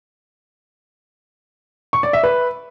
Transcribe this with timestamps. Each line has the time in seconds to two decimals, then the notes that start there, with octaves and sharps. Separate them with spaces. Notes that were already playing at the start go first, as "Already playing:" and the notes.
1.93 C#6
2.03 D5
2.13 E5
2.23 B4